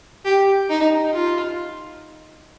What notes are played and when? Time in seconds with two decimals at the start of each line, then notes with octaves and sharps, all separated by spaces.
0.25 G4
0.70 D#4
1.13 F4